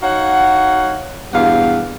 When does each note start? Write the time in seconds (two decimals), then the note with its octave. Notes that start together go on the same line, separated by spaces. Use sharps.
0.02 D#4 F#4 C#5 F5 F#5
1.32 E2 G2 B2 G4 F5 F#5